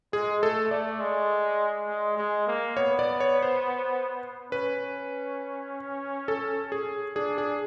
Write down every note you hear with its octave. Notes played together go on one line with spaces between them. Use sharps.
G#3 G#4
A3 A4
A3 D5
G#3
G#3
G#3
A#3
B3 C#5
D5
C#5
C5
C#4 B4
A4
G#4
D4 G#4
G#4